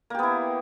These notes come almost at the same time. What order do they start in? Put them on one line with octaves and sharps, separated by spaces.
A#3 G4 B3 E4